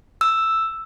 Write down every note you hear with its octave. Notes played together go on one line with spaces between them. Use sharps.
E6